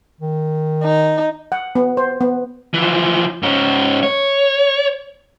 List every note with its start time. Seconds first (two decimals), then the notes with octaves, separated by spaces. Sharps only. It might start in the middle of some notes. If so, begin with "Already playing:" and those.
0.21 D#3
0.83 D#4
1.52 F#5
1.75 B3
1.97 C5
2.21 B3
2.74 E3 F3
3.43 G#2 C#4
4.03 C#5